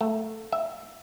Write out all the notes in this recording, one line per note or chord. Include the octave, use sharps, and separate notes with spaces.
A3
E5